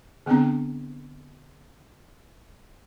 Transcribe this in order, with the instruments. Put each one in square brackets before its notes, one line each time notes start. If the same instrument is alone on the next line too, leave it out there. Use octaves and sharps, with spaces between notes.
[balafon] D3 B3 C4 D4 A#5